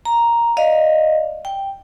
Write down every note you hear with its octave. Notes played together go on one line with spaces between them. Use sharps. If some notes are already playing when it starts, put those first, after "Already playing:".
A#5
D5 D#5 F5
G5